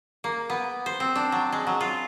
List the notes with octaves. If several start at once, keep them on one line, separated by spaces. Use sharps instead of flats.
A#3
B3
C5
C4
D4
F#3
G#3
F#3
F4